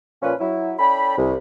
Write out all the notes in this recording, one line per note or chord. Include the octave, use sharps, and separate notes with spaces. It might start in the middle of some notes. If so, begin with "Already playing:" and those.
A#2 F3 C#4 B4
F#3 E4
C#4 A4 D5 G5 B5
C2